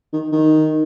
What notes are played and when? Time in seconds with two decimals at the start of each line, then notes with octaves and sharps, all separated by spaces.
0.13 D#3
0.32 D#3